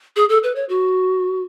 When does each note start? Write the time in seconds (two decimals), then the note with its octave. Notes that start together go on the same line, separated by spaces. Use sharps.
0.16 G#4
0.29 A4
0.43 B4
0.56 C#5
0.69 F#4